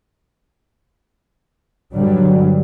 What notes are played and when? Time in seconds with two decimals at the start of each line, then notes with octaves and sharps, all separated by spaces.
1.94 G2 D3 F#3 G3